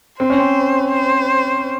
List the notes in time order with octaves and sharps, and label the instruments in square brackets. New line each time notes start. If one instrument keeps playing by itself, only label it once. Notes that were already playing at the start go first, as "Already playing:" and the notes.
[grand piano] C4 [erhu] C5
[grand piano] C#4
C4
[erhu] C5